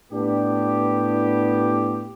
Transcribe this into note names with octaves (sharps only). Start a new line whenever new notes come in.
A2 B3 D4 G4